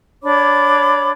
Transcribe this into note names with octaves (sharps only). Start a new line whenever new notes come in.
D4 C#5 B5 D6